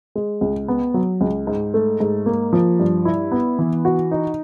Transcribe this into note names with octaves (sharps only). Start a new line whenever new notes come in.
G#3
C#2
B3
F#3
C#2
G#2
A3
G#2
A#3
F3
G2
E4
B3
E3
F#4
D#4